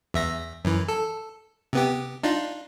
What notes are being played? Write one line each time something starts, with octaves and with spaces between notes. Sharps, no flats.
E2 E5 A#6
F#2 E3
A4
C3 B3 G4
D4 D#4 F4